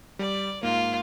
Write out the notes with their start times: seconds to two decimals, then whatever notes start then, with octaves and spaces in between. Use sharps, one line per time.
0.19 G3 D5
0.63 G#2 A#3 F4